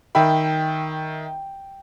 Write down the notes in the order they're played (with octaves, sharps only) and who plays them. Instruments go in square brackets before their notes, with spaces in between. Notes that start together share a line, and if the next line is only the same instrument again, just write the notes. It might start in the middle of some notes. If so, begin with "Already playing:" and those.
[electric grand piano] D#3 E5 B5 [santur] G5